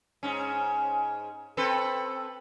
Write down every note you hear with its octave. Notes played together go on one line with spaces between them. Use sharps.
G#2 C#4
C4 A4 B4